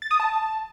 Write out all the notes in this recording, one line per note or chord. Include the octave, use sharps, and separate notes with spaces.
A6
D#6
A5